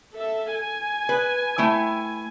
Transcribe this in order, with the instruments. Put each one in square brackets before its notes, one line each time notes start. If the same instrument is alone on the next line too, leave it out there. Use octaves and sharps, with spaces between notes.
[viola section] A4 E5
G#5
[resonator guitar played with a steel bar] B4
A3 E4 G5